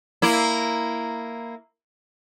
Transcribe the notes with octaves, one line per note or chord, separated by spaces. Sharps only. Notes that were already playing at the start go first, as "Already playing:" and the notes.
A#3 E4